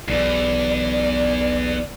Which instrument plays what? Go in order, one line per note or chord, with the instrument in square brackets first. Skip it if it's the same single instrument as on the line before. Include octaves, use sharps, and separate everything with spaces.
[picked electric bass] B1 [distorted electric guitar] E2 [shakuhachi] D5